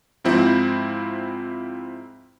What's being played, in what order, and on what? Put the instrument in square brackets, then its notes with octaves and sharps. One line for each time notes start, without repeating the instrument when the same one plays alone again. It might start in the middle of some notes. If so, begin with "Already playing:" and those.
[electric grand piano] G#2 F3 C4 E4